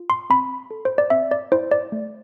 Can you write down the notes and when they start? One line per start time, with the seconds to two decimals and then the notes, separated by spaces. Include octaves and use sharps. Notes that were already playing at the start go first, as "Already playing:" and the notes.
Already playing: F4
0.10 C6
0.30 C4 B5
0.71 A4
0.85 C5
0.98 D5
1.10 C4 E5
1.31 D5
1.52 E4 C5
1.71 D5
1.92 A3